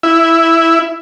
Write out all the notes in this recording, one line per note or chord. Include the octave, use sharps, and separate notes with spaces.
E4